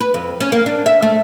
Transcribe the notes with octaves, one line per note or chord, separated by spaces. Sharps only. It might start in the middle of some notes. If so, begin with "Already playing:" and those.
B4
F2
C#4
A#3
D4
E5
A3